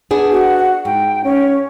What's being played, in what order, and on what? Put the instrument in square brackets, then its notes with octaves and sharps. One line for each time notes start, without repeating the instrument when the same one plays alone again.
[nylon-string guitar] B3 D4 G#4
[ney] F#4
[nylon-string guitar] G#2 [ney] G5
[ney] C#4